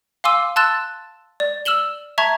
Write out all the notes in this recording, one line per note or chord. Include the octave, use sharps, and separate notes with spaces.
F5 G#5 C6 D6 E6 D#7
A5 C6 E6 F#6 A6 E7
D5
E6 F6 E7 F#7 G7
E5 A5 A#5 C#6 G#6